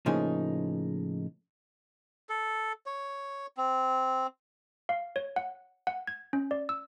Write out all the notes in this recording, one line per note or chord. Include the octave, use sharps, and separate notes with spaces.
A2 C#3 F3 A#3 D#4 G#4
A4
C#5
C4
F5
C#5
F#5
F#5
G#6
C#4
D5
E6